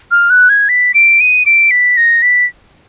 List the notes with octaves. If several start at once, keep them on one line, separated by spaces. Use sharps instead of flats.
F6
F#6
G#6
B6
D7
D#7
D7
B6
A#6
B6